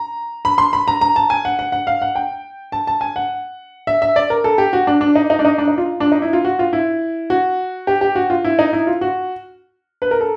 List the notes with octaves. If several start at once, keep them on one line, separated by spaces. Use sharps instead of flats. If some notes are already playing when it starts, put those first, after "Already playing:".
Already playing: A#5
B5
C6
B5
A#5
A#5
A5
G#5
F#5
F#5
F#5
F5
F#5
G5
A5
A5
G#5
F#5
E5
E5
D5
A#4
A4
G4
F#4
D4
D4
D#4
D#4
D4
D#4
D4
D#4
F4
D4
D#4
E4
F4
F#4
F4
E4
F#4
G4
G4
F#4
F4
E4
D#4
E4
F4
F#4
B4
A#4
A4